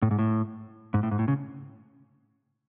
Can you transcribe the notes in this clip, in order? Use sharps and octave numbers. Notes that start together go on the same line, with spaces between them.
A2
G#2
A2
G#2
A2
G#2
A2
C#3